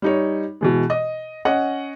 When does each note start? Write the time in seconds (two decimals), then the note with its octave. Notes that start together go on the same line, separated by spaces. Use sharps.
0.02 G3 D#4 C#5
0.61 B2 E3 G#3
0.90 D#5
1.45 C#4 D#5 F#5